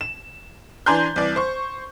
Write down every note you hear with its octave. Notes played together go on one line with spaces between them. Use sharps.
E7
E3 D4 G#5 A#5 C6 G6
C2 E3 D5
C5 C#6